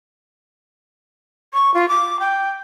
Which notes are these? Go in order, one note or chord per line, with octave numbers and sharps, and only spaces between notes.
C#6
F4
D6
G5